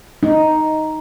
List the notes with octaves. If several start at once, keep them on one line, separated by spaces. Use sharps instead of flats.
D#4